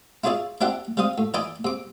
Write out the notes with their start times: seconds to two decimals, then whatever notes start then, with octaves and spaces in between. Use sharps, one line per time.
0.24 E4 F4 G#4 C#5 D5 E5
0.61 C4 D4 E4 G4 E5 F#5
0.97 G3 C4 F5 D#6
1.18 A2
1.34 E3 D5 D#5 G#5 B5 D6
1.65 C3 D6